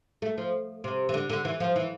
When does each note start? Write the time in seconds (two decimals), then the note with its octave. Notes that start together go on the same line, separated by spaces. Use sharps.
0.22 A3
0.38 F3
0.84 C3
1.09 E3
1.14 D3
1.29 D3
1.45 E3
1.60 F3
1.76 E3